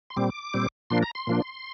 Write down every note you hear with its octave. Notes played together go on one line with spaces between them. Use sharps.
C6
A#2 G3 C4 D6
A#2 G3 C4
A#2 F3 A#3 D4 C6
A#5
C6
A#2 F3 A#3 D4